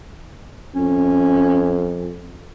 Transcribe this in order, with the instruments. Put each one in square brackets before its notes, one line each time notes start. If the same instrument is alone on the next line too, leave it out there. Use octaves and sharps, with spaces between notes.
[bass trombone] F2 [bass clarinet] C#4